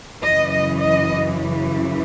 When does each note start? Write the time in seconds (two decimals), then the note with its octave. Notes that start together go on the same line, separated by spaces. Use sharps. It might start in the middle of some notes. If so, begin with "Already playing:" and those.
0.23 F#2 C#3 E3 D#5
0.52 D#5
0.81 D#5